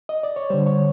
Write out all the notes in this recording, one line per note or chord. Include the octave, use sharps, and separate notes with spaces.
D#5
D5
C#5
D3 G3 C5
C#5